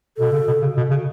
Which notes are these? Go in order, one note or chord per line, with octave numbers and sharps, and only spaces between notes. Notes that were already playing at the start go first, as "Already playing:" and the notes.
B2 A4
C#3
B2
C#3
B2
C#3